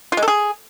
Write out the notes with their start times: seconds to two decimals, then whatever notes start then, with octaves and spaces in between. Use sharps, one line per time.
0.12 F4
0.17 G#3
0.22 A4
0.28 G#4